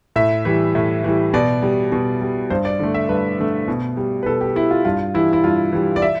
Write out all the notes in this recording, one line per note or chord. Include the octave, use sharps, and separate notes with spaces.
A2 E5
E3 G3
A2
E3 G3
B2 D5
G3
B2
G3
G2 C5
D5
D3 A3
E5
G2 B4
D3 A3
B2
G3
B4
B2 A4
G4
G3 E4
F4
G2 F4
E3 G3 E4
E4
G2 F4
E3 G3
D5
E5